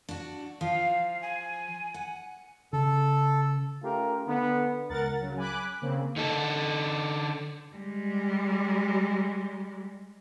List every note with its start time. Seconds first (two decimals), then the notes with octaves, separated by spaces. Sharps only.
0.09 D4 F#4
0.61 F3 F5
1.22 G#5
1.94 F#5
2.73 C#3 A4
3.82 A3 C#4 F4 G4 A#4
4.27 D3 B3
4.89 C#2 A#4 F#5 A6
5.20 C#3 F#3
5.37 G#5 B5 D6 F#6
5.82 C#3 A#3 C4
6.16 D3 D#4 A4
7.75 G3 G#3